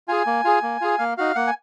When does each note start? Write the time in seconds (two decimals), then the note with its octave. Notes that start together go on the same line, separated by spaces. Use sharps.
0.08 F4 G#4 G#5
0.27 A#3
0.45 F4 G#4
0.63 A#3
0.81 F4 G#4
0.98 A#3 F5
1.17 D#4 F#4 F5
1.35 A#3 F#5
1.47 G#5